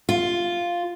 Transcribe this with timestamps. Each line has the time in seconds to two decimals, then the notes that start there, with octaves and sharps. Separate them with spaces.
0.09 F4